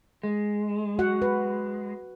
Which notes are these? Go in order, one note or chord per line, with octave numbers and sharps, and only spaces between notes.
G#3
F#4 F#5
B4